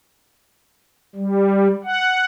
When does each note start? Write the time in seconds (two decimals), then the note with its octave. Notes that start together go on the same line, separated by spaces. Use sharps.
1.15 G3
1.84 F#5